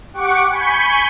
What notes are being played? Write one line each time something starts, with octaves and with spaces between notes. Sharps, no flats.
G4 F#5 C#6 D6
G#5 B5 C#6 G6